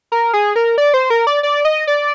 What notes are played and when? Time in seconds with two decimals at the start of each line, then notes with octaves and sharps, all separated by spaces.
0.12 A#4
0.33 G#4
0.56 A#4
0.78 D5
0.94 C5
1.10 A#4
1.27 D5
1.43 D5
1.65 D#5
1.87 D5